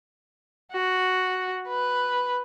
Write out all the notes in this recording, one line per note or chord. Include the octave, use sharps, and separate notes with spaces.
F#4
B4